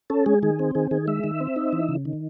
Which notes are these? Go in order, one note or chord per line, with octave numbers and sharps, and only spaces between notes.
C#4 A4
G#3 G#4
D#3 G#4
C4
D#3 G#4
D#3 G#4
G#3 E5
D#3
C4
D#4
E3
C#3
D#3